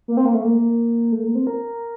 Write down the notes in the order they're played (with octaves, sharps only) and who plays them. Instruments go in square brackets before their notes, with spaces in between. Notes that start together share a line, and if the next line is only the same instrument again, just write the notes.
[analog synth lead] A#3
C4
A#3
A3
A#3
A3
A#3
C4
A#4